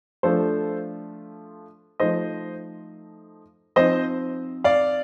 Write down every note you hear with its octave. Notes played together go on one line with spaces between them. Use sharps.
F3 A3 D4 F4 A4 C5
F3 A3 D#4 C5 D#5
F3 C4 D#4 C5 D#5
D5 F5